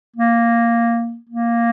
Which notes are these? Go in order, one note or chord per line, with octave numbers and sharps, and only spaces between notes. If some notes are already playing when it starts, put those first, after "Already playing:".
A#3
A#3